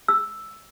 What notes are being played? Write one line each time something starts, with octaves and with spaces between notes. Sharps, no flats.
E6